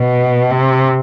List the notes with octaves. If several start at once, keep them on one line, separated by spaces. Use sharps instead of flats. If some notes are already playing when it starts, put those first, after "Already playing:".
Already playing: B2
C3